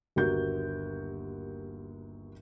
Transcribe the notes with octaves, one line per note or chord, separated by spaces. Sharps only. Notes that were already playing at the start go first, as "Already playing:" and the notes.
G1 D#2 F#4 A#4 G6